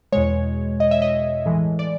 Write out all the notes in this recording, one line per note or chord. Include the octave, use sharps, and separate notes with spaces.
E2 B2 G#3 C#5
D#5
E5
D#5
A2 E3 G#3
D5